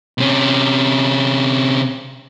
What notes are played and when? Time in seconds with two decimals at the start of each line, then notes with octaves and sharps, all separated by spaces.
0.18 C3 C#4